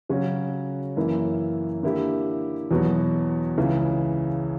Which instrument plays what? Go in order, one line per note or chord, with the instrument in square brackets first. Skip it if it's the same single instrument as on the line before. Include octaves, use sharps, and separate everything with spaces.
[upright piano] C#3 F#3 C#4 F#4
F#2 E3 A#3 E4
D3 A#3 E4 G4
E2 B2 F#3 B3
C#2 C#3 E3